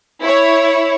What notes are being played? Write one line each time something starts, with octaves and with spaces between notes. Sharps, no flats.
E4 C#5